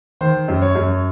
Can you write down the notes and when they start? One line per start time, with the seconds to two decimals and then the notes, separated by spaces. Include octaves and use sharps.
0.21 D#3 C5
0.48 F#2
0.62 C#5
0.75 F#2